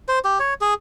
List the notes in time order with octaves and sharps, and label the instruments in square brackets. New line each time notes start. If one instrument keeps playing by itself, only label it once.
[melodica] C5
G4
C#5
G#4